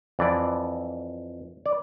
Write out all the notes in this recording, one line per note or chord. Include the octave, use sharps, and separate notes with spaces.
F2 E3 D5
D5